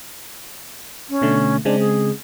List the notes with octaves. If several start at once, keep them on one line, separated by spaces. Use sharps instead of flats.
C#4
B2 D3 A3
C#3 G#3 C4 D4
G#4